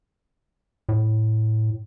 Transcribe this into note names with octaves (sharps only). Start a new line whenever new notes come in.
A2